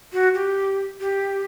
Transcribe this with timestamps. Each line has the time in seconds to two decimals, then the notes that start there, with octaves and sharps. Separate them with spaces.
0.13 F#4
0.35 G4
1.00 G4